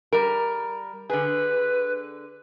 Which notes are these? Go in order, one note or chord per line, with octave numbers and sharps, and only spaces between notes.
G3 A#4
D3 G#4 B4